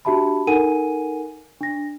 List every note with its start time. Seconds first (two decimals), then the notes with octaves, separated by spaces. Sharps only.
0.05 D4 F#4 G4 E5 A5 B5
0.47 D#4 A4 A#4 F#5 G#5 D#7
1.60 D4 A#6